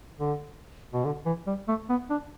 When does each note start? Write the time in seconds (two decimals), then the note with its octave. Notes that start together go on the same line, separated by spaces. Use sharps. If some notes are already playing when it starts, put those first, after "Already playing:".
0.20 D3
0.93 B2
1.04 D3
1.26 E3
1.47 G3
1.68 A3
1.89 B3
2.10 D4